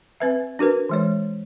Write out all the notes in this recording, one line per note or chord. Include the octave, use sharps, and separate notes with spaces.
C4 B4 E5
D4 F#4 A#4 B4
E3 G#3 C#5